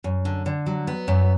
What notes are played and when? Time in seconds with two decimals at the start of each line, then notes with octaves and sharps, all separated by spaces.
0.04 F#2
0.25 D3
0.46 D3
0.66 F#3
0.87 B3
1.08 F#2